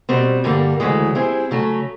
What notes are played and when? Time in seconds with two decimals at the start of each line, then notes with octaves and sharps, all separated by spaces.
0.09 B2 G3 C4
0.44 G2 D3 G3 A#3
0.80 D2 C#3 E3 G#3
1.15 G3 C4 E4 G#4
1.51 C#3 F#3 A3 C#4